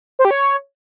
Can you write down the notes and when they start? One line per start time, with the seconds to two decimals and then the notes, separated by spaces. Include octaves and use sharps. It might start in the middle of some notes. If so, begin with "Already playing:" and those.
0.19 C5
0.25 G4
0.31 C#5